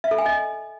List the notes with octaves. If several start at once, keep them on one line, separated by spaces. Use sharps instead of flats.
E5
A4
G#5
D#5